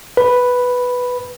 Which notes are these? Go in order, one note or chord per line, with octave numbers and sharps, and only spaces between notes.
B4